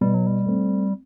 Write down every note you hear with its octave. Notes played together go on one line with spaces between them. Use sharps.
B2 G3
F#3
G3
A3 C4